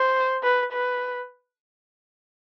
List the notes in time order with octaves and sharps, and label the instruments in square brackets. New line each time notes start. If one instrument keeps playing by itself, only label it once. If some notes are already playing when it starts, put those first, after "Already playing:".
Already playing: [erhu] C5
B4
B4